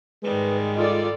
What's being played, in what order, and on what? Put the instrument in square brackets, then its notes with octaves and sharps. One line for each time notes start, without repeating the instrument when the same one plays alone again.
[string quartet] G#2 D#3 G3 [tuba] G#3 [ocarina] B4
[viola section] F4 A4 D5 [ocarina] D#5